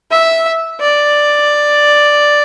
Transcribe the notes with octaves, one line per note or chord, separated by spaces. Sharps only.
E5
D5